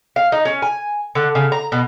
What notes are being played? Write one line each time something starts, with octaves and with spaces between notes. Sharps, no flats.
F5
D#4
C#4
G#5
D3
C#3
A#5
B2